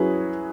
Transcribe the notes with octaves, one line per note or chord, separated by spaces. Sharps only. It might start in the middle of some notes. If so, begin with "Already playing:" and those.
Already playing: F#3 C#4 E4 G#4 B4